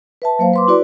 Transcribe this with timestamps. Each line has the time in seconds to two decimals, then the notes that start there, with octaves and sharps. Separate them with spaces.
0.22 B4 E5 A5
0.39 F#3 A#3 C5 F5
0.53 B4 C6 D6
0.68 E4 F#4 B4 D5